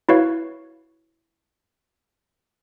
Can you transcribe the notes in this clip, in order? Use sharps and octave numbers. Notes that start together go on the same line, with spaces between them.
E4 F#4 B4 C#5 F5